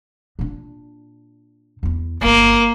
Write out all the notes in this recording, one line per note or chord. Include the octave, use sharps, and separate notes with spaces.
A#2 D4
E2 E4
G1 D2 A#3